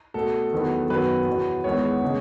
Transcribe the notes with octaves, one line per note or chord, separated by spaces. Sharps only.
B2 A3 A4
E2 D#3 F#3 B3
F#2 D#3 F#3 B3 B4
E2 B2 F#3
E2 D#3 G#3 B3 C#5
C#3 G#3